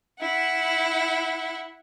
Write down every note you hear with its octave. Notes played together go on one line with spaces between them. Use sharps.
E4 F#5